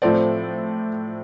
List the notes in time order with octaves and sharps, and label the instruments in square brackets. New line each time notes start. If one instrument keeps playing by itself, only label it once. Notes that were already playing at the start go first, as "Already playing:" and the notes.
[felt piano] A2 F3 C4 A4 D5